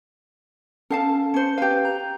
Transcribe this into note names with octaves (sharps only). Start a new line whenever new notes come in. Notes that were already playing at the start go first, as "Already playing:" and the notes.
C#4 A4 F5 A5
C#4 C5 C#7
G4 B4 F5
A#5